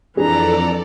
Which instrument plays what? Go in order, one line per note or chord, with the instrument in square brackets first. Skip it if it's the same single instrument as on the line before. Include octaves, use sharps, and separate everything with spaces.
[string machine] F2 A4 D5 [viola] E3 A#5 [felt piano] D4 G#4